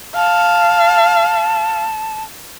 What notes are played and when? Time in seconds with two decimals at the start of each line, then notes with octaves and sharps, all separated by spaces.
0.16 F5 A5